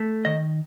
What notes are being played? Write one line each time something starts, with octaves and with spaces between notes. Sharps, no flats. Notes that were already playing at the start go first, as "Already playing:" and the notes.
Already playing: A3
D#3 D#5